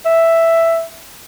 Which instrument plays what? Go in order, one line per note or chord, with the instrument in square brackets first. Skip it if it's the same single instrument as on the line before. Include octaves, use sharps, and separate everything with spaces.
[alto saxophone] E5